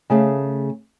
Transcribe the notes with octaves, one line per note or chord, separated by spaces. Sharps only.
C#3 A3 G#4 F5